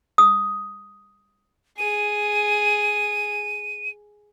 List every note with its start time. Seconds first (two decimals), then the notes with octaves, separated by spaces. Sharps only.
0.18 D#6
1.78 G#4 D#7